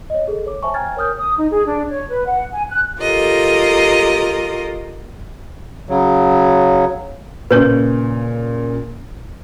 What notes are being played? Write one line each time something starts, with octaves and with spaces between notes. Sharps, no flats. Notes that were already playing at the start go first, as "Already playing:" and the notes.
C#5 D#5
G#4 A4
C#5 D6
C5 C#5 E5 G#5 A5 C#6
G5 G#5 A#5 F6 G#6 A6
A#4 C#5 G#5 D#6 F6 G6
D#6
D#4
G#4
D4
C#5
B4
F#5
G#5
F#6
F4 G4 A4 A#4 D#5
C#3 F#3
A#2 C#3 B4 C#5 C#6